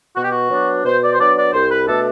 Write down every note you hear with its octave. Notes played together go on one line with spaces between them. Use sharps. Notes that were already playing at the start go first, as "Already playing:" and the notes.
B2 F#4
G4
F#4
F#3 B3 D4
B2 C5
D5
C5
F#3 B3 D4 D5
D5
C2 C5
B4
B2 A3 D4 A4